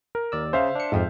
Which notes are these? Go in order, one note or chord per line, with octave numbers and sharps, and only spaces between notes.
A#4
D#2 D5 E6
C#3 C5 E5 F5
D4 C#7
F2 G#2 F3